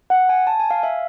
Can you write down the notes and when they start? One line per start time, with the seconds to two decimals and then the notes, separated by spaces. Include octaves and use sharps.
0.10 F#5
0.29 G#5
0.47 A5
0.60 G#5
0.70 F5
0.83 E5